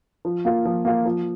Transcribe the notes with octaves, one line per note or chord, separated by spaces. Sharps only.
F3
A#3 F4
F3
A#3 F4
F3